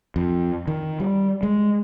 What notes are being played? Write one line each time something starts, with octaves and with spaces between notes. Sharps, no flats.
F2
D#3
G3
G#3